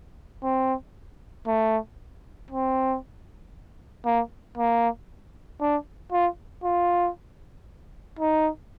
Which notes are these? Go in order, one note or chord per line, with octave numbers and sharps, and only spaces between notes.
C4
A3
C4
A#3
A#3
D4
F4
F4
D#4